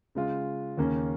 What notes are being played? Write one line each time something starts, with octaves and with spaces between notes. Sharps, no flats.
C#3 G#3 F4
D#2 C#3 A#3 C#4